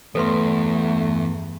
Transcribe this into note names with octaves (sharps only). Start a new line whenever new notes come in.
E2 G2 A3 A4 B4 C6